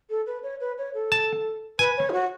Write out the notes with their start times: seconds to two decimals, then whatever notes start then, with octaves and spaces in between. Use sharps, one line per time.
0.10 A4
0.26 B4
0.43 C#5
0.60 B4
0.78 C#5
0.94 A4
1.12 A5
1.79 B4 G#5
1.97 C#5
2.10 E4
2.13 F#4